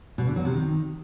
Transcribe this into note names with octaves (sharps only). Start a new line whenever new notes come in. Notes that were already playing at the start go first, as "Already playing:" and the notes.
B2
D3
F#3
C3
D#3